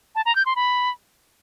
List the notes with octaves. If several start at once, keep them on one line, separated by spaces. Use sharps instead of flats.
A5
A#5
G6
C6
B5